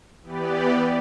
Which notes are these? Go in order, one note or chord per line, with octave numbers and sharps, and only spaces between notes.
E3 B3 G4 B4 D5